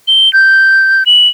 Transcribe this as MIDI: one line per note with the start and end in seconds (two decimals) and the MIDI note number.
0.08 0.32 103
0.33 1.04 91
1.06 1.28 102